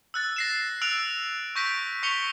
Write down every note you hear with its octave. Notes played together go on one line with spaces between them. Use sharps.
E6 F#6 A6
A#6 C7 E7
E6 F#6 D7 F7
C#6 G6 A#6 B6 D7
C#6 B6 C#7 F7 G7